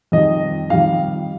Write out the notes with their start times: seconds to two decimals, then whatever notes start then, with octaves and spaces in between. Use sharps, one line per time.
0.12 F2 D#3 G3 D#5
0.70 F2 D#3 G3 F5